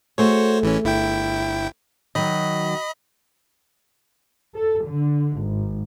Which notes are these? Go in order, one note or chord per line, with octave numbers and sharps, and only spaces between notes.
A3 F#4 G#4 C5 C#5
A1 E3 C#4
G1 E4 G5
D#3 F#3 D#5 B5
A4
D3
G#1